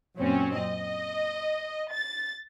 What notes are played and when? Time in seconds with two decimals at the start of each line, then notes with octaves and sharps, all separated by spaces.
0.18 F#2 A#2 C4 C#4
0.57 D#5
1.94 A6